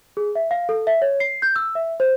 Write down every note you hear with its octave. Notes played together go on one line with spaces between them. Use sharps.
G#4
E5
F5
A4
E5
C#5
C7
G6
E6
E5
C5